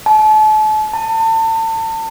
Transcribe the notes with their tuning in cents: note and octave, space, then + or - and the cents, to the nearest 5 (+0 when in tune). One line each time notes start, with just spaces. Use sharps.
A5 -35
A5 +35